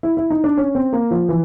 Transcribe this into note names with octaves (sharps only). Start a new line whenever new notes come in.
E4
E4
D#4
D4
C#4
C4
A#3
F3
E3